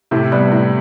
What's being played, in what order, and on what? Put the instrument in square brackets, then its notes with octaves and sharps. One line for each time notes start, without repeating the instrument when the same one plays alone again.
[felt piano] A2 [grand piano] C3
[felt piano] G3 B3
A2